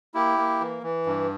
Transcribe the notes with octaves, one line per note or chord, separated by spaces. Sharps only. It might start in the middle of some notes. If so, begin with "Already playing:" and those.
A#3 E4 G4
A#3
E3
E3
G2